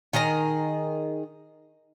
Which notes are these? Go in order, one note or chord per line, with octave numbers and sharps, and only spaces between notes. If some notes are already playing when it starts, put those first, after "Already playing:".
D#3 G#4 D#5 A#5